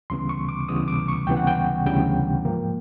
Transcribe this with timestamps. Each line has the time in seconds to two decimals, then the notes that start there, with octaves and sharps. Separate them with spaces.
0.10 D2 C#3 E3 G3 B3 C6
0.29 C#6
0.49 D6
0.69 D2 C#3 E3 G3 B3 D#6
0.88 D6
1.08 C#6
1.27 D2 C#3 E3 G3 B3 G5
1.37 F#5
1.47 G5
1.86 D2 C#3 E3 G3 B3 G5
2.45 G#2 F3 A#3